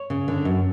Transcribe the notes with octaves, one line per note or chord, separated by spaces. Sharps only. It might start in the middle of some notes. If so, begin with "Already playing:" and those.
Already playing: C#5
C#3
D3
F#2